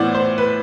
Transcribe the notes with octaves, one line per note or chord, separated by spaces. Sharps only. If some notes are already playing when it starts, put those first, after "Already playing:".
Already playing: A2 E3 B3 E4 C5 D5
C5
B4